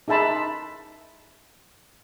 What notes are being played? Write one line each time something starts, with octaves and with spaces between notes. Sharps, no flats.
D#4 G#4 E5 A5 B5 C6